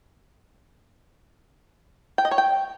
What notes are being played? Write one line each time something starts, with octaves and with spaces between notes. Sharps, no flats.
G5
D#5
C#5
G5